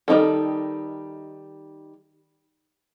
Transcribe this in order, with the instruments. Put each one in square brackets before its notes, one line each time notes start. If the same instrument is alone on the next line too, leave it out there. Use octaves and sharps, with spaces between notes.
[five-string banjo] D#3 G3 D#4 A4